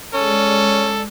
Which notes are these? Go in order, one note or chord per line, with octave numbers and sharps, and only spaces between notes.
G#3 C#4 A4 D5